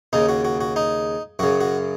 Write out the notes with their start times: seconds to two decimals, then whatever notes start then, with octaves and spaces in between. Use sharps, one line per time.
0.13 D#2 C#3 D#4
0.29 F#4
0.45 F#4
0.61 F#4
0.76 D#4
1.39 F#2 C#3 F#4
1.61 F#4